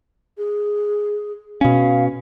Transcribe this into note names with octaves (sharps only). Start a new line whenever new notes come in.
G#4
B2 C#4 F5